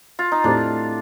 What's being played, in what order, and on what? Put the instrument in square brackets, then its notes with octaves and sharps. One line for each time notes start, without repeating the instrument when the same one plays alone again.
[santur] F4
D#4
[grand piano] A2 A3 C4 G4 C5 [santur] D4